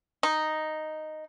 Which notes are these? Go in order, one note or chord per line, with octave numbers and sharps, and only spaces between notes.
D#4